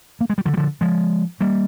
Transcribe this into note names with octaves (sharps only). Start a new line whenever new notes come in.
A#3
G#3
G3
D3 F3
G3
D3 F3
F3 G#3
G3 A#3